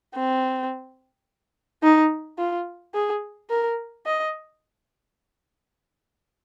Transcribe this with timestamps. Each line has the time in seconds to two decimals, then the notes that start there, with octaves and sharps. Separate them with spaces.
0.15 C4
1.83 D#4
2.38 F4
2.94 G#4
3.50 A#4
4.06 D#5